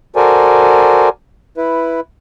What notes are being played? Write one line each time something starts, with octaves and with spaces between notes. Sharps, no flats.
F#4 A4 A#4 C5 D5 G#5
E4 B4